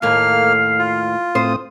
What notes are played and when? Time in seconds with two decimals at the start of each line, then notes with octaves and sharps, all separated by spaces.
0.02 D#2 A2 A#3 F5 F6
0.79 F4
1.35 A2 C4 C5 D#6